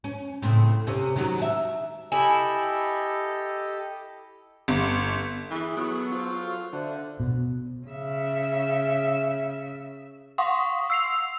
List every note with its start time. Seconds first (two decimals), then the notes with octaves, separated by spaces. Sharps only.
0.04 C#4
0.42 A2 C#3 C4
0.87 C3 C#4
1.16 D#3 F#3
1.38 A4 E5
2.12 E4 G4 A4 D#5 G#5
4.68 G1
5.51 E3 G#4
5.77 F#3 B3 A4 C#6
6.12 F4 C5
6.73 D3 A4 C5 E5 F#6
7.20 B2
7.86 C#3 E5
10.38 F5 F#5 C6 C#6 D#6
10.90 E6 C7 F7